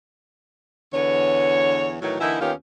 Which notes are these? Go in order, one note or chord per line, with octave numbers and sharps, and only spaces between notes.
E2 D3 B4 C#5
A2 D#3 E3 F#3
D3 E3 A#3 D#4 E4
D#2 D#3 B3 C#4 F4 G4